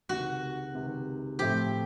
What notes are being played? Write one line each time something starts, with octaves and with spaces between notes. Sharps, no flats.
C#2 C3 D#3 F#4
C#2 C3 D#3
A2 F3 A3 C4 G4